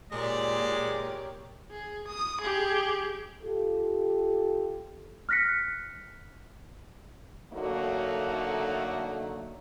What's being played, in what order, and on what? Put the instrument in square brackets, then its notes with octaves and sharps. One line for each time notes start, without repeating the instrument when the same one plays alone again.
[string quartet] A#2 [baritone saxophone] G#3 [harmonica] G4 A#4 C#5 [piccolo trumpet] D5
[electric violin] G#4
D#6
G4 G#4
[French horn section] F4 G4 A4
[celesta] F6 F#6 A#6 B6 C#7
[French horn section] D3 F#3 A3 A#3 D#4 F#4